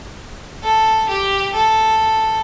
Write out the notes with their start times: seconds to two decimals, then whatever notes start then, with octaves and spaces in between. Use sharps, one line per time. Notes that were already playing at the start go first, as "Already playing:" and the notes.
0.63 A4
1.09 G4
1.54 A4